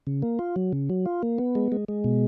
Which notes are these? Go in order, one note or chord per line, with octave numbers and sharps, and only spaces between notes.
C#3
A#3
F4
F#3
C#3
F#3
F4
A#3
B3
G#3
G#3
G#3
B2